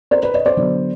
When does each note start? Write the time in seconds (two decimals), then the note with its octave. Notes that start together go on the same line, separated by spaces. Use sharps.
0.11 A#4 C5
0.23 B4
0.34 C#5 D#5
0.46 C5 D5
0.57 D3 F#3 B3